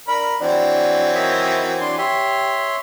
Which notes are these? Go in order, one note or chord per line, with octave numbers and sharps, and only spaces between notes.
D4 A#4 B5
E3 F#3 C4 D4
D#3 C#5 D#5 E5
D4 C6
G4 C#5 E5 C6